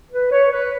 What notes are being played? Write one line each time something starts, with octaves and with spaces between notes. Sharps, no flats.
B4
C#5
B4